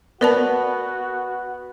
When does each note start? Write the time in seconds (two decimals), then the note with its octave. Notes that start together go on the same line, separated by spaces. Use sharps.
0.21 B3 F#4 A#4 D5 A5